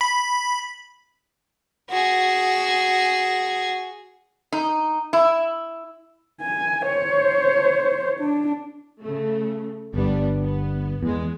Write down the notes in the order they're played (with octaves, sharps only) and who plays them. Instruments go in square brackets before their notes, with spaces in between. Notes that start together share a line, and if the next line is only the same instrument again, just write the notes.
[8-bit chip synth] B5
[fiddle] F#4 G#4
[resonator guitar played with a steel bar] D#4
E4
[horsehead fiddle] G#5
C5 C#5
D4
[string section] C#3 A3
[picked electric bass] G1 G2 [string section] G3 B3 D4
[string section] B3
[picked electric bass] E2 [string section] G#3 B3